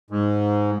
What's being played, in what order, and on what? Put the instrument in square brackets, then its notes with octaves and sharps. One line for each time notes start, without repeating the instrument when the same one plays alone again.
[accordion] G#2